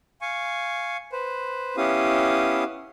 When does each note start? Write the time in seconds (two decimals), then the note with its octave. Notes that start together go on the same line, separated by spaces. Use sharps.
0.21 F5 G#5 C#6
1.12 B4 C5
1.77 B3 C#4 E4 G4 F5 D#6